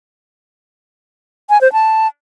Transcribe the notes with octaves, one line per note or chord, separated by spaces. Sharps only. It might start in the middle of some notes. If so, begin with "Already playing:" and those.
G#5
C5
A5